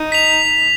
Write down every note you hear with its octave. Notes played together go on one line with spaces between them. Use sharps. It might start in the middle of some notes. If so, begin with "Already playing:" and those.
Already playing: D#4
B6 F7